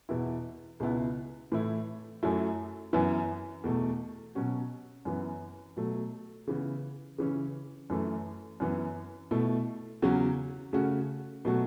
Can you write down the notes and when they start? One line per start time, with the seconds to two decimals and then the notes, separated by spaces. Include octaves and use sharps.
0.09 E2 B2 B3 E4
0.80 C#2 B2 B3 E4
1.52 A2 E3 A3 E4
2.23 F#2 F#3 A3 E4
2.93 F#2 E3 B3 E4
3.64 E2 B2 A3
4.35 B2 F#3 C#4 F#4
5.05 F#2 E3 B3
5.77 B2 F#3 A3
6.47 C#3 E3 B3
7.18 C#3 E3 C#4
7.90 F#2 E3 A3
8.60 F#2 E3 B3
9.31 B2 A3 E4
10.02 E2 C#3 F#3 C#4 F#4
10.73 C#3 A3 C#4 F#4
11.45 B2 F#3 A3 F#4